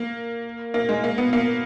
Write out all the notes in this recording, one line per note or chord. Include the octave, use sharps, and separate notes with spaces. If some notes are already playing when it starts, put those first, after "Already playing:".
Already playing: A#3
A#3
G#3
A#3
B3
A#3